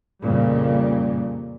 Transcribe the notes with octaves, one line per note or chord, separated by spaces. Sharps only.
F2 A#2 C#3 G3